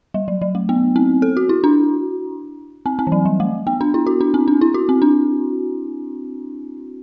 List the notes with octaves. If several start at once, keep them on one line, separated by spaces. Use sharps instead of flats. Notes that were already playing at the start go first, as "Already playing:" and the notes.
G3
F#3
F#3
A3
B3
C4
A4
F#4
E4
D4
C4
C4
E3
F#3
G3
A3
B3
D4
E4
F#4
D4
C4
D4
E4
F#4
C4
D4